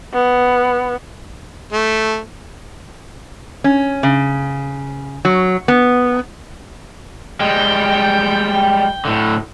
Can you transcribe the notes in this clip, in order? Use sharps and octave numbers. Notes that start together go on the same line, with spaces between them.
B3
A3
C#4
C#3
F#3
B3
G3 G#3 G5
A2 D3